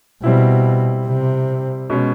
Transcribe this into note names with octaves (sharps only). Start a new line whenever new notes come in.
B2 G3 C4 E4
C3
B2 G#3 C#4